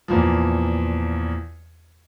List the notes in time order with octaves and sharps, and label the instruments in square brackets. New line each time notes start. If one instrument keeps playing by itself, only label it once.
[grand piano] E2 A#2 F3